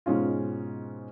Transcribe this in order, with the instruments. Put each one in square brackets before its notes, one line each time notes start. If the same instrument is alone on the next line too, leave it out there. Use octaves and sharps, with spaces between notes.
[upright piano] G#2 B2 G#3 C#4 F4